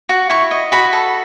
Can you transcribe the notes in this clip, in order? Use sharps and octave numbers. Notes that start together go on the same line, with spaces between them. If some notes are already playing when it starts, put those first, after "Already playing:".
F#4
E4 C#6
D#5
F#4 B5
A4